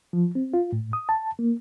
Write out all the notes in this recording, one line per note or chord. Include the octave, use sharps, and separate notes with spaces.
F3
C4
F4
A2
D#6
A5
A#3